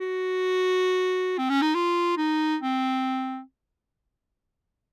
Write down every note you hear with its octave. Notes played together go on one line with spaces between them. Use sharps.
F#4
C4
C#4
D#4
F4
D#4
C4